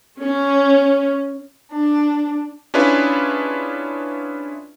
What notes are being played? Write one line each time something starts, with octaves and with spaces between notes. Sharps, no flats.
C#4
D4
C#4 D4 E4 F4 G#4 B4